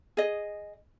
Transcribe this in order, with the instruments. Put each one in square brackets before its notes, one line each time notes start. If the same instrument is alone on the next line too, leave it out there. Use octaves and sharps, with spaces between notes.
[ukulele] G#4 D#5